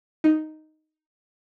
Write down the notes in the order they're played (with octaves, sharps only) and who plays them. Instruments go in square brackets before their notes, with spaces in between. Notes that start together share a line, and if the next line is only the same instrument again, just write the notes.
[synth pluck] D#4